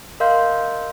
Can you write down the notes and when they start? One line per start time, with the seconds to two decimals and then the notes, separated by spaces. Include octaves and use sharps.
0.20 A#4 D#5 F5 C6 G6